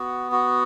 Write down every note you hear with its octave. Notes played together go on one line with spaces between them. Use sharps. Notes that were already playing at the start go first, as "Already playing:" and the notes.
Already playing: B3 F#4
F#4